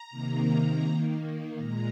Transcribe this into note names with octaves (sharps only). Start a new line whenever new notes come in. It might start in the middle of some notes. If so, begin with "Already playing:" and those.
Already playing: A#5
C3 D#3 A#3
D#3 A#3
A#2 G#3 A#5